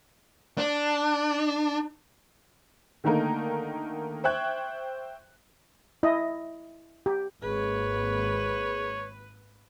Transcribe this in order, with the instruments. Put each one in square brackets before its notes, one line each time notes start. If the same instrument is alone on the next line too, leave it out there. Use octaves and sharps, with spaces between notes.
[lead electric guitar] D4
[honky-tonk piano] D3 D#3 A3 A#3 D#4 A#4
C5 E5 G5 C#6 F#6 G#6
[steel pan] E4 D#5
G4
[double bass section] G#1 A#3 [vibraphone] G#4 [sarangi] B4 [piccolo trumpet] C#5